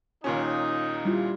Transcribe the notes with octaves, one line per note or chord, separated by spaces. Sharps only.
D#2 A#2 C#4 D#4
G3 E4 F4